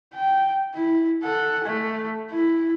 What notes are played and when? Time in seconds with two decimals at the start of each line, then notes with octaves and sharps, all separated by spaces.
0.14 G5
0.75 E4
1.24 A4 F#5
1.64 A3
2.31 E4